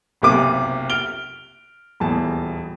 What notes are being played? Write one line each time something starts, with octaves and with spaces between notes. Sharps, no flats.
F#1 B1 C3 A#3 D6 D#7
F6 D7 G7
D#1 E2 A5